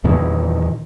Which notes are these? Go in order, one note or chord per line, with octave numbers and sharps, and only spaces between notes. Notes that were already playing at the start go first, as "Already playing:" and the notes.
E2 A#2 D#3 E3